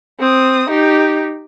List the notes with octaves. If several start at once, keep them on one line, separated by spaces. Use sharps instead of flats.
C4 D#6
D#4 G4